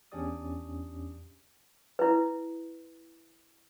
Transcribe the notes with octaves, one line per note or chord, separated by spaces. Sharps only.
E2 C#4 D4 G4 D5 D#6
E4 B4